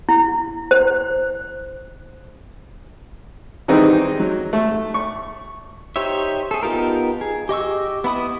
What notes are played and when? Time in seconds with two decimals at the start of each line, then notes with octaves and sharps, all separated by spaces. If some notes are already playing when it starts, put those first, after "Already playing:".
0.09 E4
0.71 C5
3.68 D#3 E3 G3 G#3 C4 D#4
4.19 F#3
4.53 A3
4.94 C#6
5.96 D#4 G4 C5 C#5 E5
6.51 G#4 A4
6.63 B3 D#4 F4 G4 A#4
7.21 G#4
7.49 G4 D#5 C#6 E6
8.04 B3 E4 B5 D#6